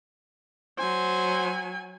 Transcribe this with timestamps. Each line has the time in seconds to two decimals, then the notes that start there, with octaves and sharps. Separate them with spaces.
0.78 F#3 C5 G#5